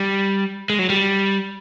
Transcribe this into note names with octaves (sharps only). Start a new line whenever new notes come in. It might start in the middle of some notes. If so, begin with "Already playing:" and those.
Already playing: G3
G#3
F#3
G3